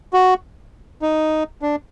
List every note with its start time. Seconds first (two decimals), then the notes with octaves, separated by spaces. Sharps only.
0.13 F#4
1.02 D#4
1.62 D4